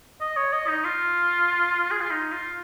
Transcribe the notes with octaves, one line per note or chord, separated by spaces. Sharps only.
D#5
C#5
D#5
D#4
F4
G#4
F4
D#4
F4